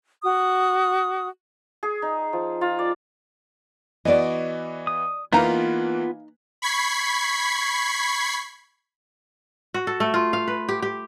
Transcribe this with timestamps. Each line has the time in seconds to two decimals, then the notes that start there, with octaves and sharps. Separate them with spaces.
0.23 F#4 D#6
1.83 G#4
2.02 D#4
2.33 F3
2.61 F4
2.79 D5
4.05 E3 B3 F#4 D5 D#5
4.87 D#6
5.33 E3 A#3 B3 D#4 F4 B4 F5 A#5
6.62 B5 C#6 G#6 B6 C7
9.74 F#4
9.87 A4
10.00 A3
10.14 F4
10.33 F5
10.48 B4
10.69 G4
10.82 G4